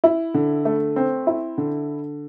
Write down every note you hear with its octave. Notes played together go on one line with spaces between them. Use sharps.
E4
D3
A3
C4
E4
D3